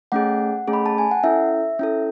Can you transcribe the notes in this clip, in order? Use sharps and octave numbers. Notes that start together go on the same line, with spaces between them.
A3 C#4 G#4 F#5
A3 C#4 G#4
B5
A5
G#5
F#5
C#4 E4 A4 E5
C#4 E4 A4